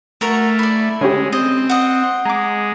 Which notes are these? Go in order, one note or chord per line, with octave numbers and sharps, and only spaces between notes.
A3 F#4 A#4 C#5
E4 D5
D3 G#3 C#4 G4
C4 D#5
D#5 F#5
G#3 A#5 D6